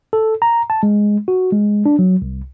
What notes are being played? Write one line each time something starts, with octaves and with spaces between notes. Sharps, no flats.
A4
A#5
A5
G#3
F#4
G#3
D4
F#3
C2